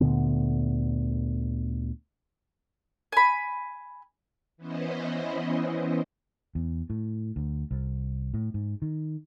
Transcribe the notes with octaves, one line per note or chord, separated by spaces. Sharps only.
D2 A#2 D3 B3
G#5 B5
E3 B3 C#4 E4 C5 D#5
E2
A2
D2
C2
A2
G#2
D#3